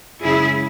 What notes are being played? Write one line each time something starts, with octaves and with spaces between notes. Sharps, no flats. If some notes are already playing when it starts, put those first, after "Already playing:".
F#2 C#3 G#3 E4 G#4